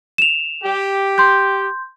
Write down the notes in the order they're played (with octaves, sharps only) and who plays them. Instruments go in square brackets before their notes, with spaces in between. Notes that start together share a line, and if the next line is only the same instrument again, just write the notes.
[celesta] E7 F7
[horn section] G4
[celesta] C6 G6